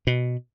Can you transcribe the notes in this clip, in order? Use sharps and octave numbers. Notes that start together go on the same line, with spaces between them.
B2